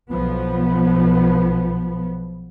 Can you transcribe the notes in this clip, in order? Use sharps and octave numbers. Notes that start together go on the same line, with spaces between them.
B1 F3 B3